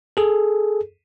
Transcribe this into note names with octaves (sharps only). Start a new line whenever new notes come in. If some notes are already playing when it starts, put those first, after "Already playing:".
G#4 A4